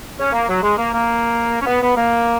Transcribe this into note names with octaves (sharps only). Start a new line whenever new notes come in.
C#4
A#3
F#3
G#3
A#3
A#3
C#4
B3
B3
A#3